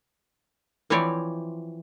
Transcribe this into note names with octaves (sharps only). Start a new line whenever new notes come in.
E3 F3 C4 E4 C#5 D5